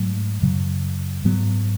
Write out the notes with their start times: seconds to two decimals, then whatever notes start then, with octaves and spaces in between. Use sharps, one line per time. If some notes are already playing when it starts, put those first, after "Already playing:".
Already playing: G#2 F#3 A3
0.42 F#2 C#3 F#3
1.24 G#2 F#3 B3